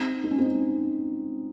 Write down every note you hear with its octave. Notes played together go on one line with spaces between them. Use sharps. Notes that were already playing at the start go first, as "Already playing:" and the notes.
Already playing: C4 D#4
D#4
C#4
C4 D#4